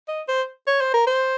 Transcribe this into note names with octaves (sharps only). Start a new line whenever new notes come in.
D#5
C5
C#5
C5
A#4
C5